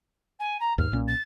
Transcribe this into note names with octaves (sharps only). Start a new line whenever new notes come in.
G#5
A#5
D#2 G#2 F6
B1 A#2 C#4
A6